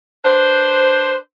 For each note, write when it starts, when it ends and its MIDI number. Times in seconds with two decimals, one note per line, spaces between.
0.24 1.14 62
0.24 1.14 71
0.24 1.14 72